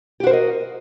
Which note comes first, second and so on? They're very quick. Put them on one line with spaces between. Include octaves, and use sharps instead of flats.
G4 F#4 C5 A#4 D#5